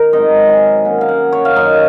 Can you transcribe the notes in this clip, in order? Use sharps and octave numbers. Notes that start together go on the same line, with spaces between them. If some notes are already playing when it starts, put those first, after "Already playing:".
Already playing: D#3 A#4
G#2 F#3 C4 D#5
G#5
D#3 A#3 C#4 F#5
F5
F#5
C#5
F5
F#2 D#3 A#3 D#5